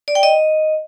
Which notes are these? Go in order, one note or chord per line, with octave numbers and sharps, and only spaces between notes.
D5
G5
D#5